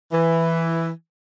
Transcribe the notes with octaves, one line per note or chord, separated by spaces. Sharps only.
E3